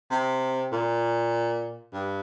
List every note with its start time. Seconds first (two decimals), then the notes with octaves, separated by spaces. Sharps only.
0.11 C3
0.72 A#2
1.93 G2